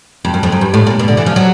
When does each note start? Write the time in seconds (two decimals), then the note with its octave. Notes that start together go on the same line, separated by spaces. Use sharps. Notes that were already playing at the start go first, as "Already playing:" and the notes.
0.25 F2
0.34 F#2
0.43 F2
0.52 F#2
0.61 G2
0.74 A2
0.87 A#2
0.99 B2
1.08 D3
1.17 E3
1.26 F3
1.36 F#3